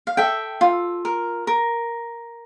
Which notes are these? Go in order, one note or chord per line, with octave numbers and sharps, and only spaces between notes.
F5
A4 E5 G5
F4
A#4
A#4